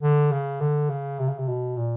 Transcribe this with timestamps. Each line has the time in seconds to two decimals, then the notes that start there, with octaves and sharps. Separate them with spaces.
0.03 D3
0.31 C#3
0.61 D3
0.90 C#3
1.19 C3
1.28 C#3
1.38 C3
1.48 B2
1.77 A#2